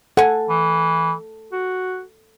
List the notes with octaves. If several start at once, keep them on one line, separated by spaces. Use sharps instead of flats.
A4 F#5 G#5
E3
F#4